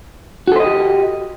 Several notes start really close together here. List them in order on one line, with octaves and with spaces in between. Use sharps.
F#4 A4 C5 D#5 G4